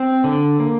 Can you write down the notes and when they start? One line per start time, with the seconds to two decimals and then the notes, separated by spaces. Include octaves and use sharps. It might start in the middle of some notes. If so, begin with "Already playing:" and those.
Already playing: C4 C5
0.24 D3
0.60 A#3